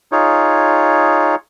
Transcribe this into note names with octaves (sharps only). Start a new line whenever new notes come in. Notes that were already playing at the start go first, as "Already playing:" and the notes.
D#4 F4 G#4 C#5